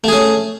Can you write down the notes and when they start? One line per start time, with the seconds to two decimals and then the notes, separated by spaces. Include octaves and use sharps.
0.04 A3
0.08 G#4
0.12 C#4